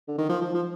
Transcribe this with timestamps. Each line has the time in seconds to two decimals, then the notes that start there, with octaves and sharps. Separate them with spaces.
0.08 D3
0.18 D#3
0.29 F3
0.42 F3
0.54 F3